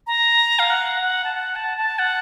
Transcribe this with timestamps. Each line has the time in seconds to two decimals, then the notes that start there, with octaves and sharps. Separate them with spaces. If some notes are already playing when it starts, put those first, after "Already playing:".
0.07 A#5
0.59 F5
0.70 F#5
1.02 F#5
1.24 A5
1.35 F#5
1.56 A5
1.78 A5
1.99 F#5